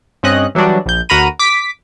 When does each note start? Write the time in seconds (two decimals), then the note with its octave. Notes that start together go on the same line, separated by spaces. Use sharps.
0.23 G2 C4 C#4 D#5 F#6
0.55 E3 F#3 G3 D4 F#4
0.86 A#1 G6
1.09 D2 F#4 A#4 A#5 B5 D#7
1.39 D6 B6